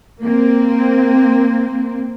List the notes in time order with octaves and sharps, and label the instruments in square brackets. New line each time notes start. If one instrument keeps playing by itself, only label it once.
[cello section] A#3 C4